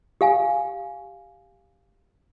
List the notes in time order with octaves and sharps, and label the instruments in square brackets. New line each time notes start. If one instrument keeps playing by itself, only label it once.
[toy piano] G4 F5 G#5